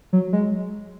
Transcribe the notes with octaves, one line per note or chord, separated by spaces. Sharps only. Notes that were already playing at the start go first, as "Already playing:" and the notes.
F#3
G#3